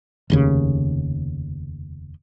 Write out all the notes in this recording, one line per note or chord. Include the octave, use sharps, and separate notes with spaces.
F1 D#2 C#3